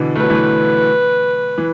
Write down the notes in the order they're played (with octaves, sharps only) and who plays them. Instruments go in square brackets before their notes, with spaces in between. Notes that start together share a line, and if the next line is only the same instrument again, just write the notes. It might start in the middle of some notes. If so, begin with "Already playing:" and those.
Already playing: [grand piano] B2 D3 E3
[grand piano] A3 [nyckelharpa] B4
[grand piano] F#3
E3 A3
E3